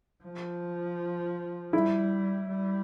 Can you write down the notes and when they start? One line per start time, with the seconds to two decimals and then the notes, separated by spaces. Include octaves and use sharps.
0.24 F3
1.73 G3 E4
2.48 G3